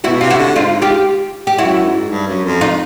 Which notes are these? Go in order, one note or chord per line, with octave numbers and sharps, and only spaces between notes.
B2 E4 F#4
C3 F4
E4 F#4
D3
G#2 D#4 F4
F4 G4
G4
F#2 E4 F#4
G#2
G2
F#2
F2
D#4 F4